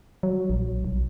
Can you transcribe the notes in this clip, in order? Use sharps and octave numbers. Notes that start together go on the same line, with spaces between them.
F#3
A#1
B1